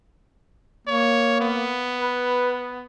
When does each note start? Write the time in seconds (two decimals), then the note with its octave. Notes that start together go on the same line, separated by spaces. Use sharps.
0.88 A#3 C#5
1.41 B3
2.01 B4